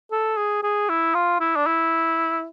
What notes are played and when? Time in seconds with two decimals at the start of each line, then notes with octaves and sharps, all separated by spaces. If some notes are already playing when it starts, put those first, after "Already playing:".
0.12 A4
0.37 G#4
0.63 G#4
0.89 E4
1.14 F4
1.40 E4
1.56 D4
1.67 E4